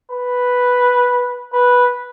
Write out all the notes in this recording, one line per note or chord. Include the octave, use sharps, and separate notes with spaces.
B4
B4